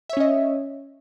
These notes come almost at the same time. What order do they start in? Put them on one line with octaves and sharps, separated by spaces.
E5 C#5 C#4 D#5